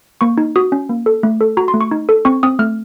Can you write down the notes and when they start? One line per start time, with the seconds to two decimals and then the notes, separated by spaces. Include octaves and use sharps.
0.21 A#3 C#6
0.38 D#4
0.56 F#4 D#6
0.72 C#4
0.89 A#3
1.06 A4
1.23 A3
1.41 A4
1.57 F#4 A#5
1.68 C6
1.74 A3
1.81 C#6
1.91 D#4
2.09 A4
2.25 C4 C#6
2.43 C4 D#6
2.59 A3 F6